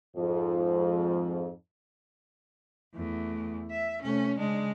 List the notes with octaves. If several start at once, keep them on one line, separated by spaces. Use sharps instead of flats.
F2 G#2 F3
E2 A3
E5
C3 A3 C#4
C#3 G#3 D4